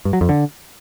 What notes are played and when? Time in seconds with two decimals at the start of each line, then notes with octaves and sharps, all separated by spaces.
0.05 G2
0.13 F#3
0.21 F2
0.29 D3